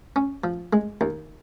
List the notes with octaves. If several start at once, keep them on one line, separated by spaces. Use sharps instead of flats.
C#4
F3
G#3
D#2